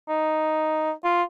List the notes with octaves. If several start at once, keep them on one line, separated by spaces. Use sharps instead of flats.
D#4
F4